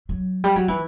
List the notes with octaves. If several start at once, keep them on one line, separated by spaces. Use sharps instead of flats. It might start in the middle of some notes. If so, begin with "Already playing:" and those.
F#3
G3
F#3
E3